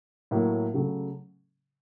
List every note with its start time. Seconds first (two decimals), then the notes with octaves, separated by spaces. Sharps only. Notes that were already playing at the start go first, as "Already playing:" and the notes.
0.31 A2 F#3 A#3
0.74 C#3 F#3 A3